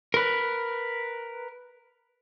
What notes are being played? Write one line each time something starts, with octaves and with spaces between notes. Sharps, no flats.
A#4 B4